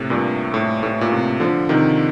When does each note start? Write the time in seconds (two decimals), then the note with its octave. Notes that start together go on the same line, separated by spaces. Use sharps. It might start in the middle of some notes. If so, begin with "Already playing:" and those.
Already playing: A2 C3
0.10 G2 A#2
0.54 A2
0.83 A2
1.01 A#2
1.11 A2 C3
1.40 D3 F3
1.69 C3 D#3